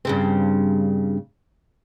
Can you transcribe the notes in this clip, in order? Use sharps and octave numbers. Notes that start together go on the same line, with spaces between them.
G2 C#3 C4